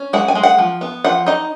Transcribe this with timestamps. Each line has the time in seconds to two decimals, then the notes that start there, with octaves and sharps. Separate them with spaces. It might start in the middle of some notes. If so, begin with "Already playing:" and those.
Already playing: C#4
0.13 G#3 F#5
0.28 G#5
0.35 G#3
0.43 F#5
0.58 F3
0.81 B3
1.04 F3 F#5
1.26 D#4 D#5